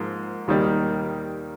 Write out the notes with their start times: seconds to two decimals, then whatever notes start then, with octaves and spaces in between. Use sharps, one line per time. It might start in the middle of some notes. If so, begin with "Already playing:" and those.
Already playing: G#2 F3 A#3
0.47 D#2 D#3 G3 A#3